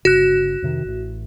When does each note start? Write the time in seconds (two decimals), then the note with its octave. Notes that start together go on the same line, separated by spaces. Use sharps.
0.05 G1 C#3 F#4 F#6
0.62 F2 C3 D#3
0.85 A1 A2